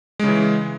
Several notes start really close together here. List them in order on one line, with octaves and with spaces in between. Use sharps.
G#3 C#3 E3